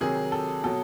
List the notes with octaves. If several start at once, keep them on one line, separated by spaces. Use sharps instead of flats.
C3 D#3 F#3 G#4
A4
B2 F#3 A4